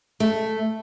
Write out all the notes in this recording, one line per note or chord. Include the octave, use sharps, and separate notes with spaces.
A3